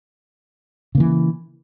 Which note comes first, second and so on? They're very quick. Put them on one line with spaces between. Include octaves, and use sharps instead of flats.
C#3 A#3 E3